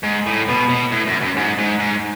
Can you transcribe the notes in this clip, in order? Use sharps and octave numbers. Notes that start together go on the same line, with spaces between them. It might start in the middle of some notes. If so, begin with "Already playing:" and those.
G#2
A2
B2
B2
A2
F#2
F#2
G#2
G#2
G#2